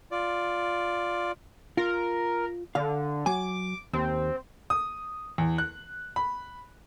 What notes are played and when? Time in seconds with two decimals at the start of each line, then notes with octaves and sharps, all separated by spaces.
0.11 F4 D5
1.77 F4 A#4
2.75 D3 F5
3.26 F#3 G#5 D6
3.93 D#2 C4
4.70 D#6
5.38 E2
5.58 F#6
6.16 B5